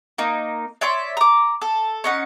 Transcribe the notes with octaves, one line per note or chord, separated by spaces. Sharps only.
A#3 D#4
C#5 D5 E5 C6
A#5 D6
A4
C#4 D#4 F#5